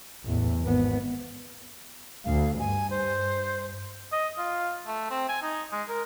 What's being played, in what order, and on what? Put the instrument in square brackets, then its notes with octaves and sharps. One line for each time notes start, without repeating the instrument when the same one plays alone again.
[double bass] A1 E2
G#1 B3
[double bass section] D2 [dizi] F5
[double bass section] G2 [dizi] G#5
[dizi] C5
[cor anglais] D#5
F4
A3
C4
G#5
D#4
G#3
A#4